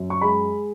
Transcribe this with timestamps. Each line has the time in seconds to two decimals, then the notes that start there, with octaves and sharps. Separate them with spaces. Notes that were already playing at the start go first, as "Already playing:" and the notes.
Already playing: F#2
0.10 C#6
0.21 G#3 B5